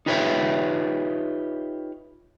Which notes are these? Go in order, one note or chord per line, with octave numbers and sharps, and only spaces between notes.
D#4 F4 G4 B4 C#5 E5